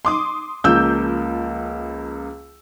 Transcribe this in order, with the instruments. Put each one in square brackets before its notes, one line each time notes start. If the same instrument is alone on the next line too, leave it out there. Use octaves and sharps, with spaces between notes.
[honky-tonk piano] C6 D6 D#6
[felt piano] C#2 A#3 E6 [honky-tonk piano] F3 G6